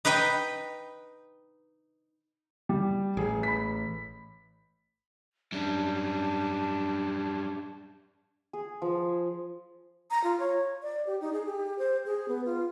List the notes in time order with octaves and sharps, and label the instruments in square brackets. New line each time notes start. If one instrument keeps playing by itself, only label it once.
[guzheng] D#4 B4 D#5 G5
[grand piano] G3
[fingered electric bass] A1 [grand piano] G#4
[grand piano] B5 B6
[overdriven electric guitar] F#2 G3 [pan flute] D4
[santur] G#4
F3
[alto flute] A#5
F4
C#5
D5
G4
D#4
G#4
G4
C5
G#4
B3
F4